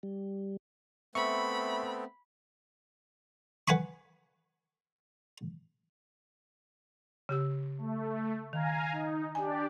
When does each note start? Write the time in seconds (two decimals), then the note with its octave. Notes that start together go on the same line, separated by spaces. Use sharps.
0.03 G3
1.15 A3 B3 C4 E5 B5 C#6
3.68 B4 F#5 G#5 B5 C#6
7.29 C#3 G4 E6
7.78 A3
8.53 D#3 F5 G#5 A#5
8.92 D#4
9.35 D4 G4 D5 G#5